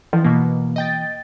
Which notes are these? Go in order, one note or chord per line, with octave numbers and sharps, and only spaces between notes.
E3 F3
B2 A#3
D#5 G5 A6